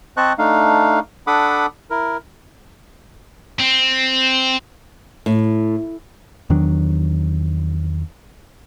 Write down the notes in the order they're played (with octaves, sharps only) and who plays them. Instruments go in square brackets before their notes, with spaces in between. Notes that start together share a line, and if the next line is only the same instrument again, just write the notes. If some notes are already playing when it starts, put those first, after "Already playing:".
[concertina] C4 C5 D#5 A5 C#6 F#6
A3 D4 D#4 F5
D4 A4 F#5 B5 D6 D#6
E4 A#4
[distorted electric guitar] C4
[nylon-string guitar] A2
[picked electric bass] E2 D#3 F#3 D4